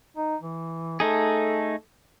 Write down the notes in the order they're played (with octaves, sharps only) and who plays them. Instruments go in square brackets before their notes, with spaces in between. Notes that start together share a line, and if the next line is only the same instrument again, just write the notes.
[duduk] D#4
E3
[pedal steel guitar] A3 D#4 G#4 [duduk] A4